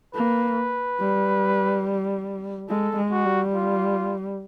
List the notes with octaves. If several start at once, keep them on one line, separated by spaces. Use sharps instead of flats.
A#3 B4
G3
G#3 A4
G#3
F#4
G3
F4